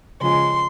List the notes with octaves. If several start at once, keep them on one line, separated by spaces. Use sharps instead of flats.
C#3 F3 G#3 C6